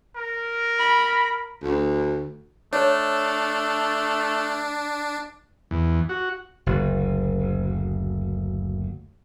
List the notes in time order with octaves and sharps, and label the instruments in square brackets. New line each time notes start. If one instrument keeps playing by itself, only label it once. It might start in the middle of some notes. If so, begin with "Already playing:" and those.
[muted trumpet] A#4
[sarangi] B5
[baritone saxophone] D2
[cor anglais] A3 [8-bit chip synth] D4 [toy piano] C#5
[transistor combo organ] E2
F#4
[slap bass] F#1 D2